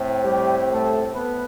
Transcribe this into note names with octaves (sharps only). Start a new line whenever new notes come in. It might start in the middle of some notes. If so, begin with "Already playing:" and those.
Already playing: A2 C4
G3 G4
A3 A4
B3 B4